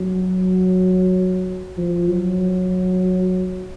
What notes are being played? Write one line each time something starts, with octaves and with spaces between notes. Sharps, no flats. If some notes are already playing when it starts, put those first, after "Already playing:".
Already playing: F#3
F3
F#3